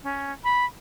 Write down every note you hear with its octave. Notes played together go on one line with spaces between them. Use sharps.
C#4
B5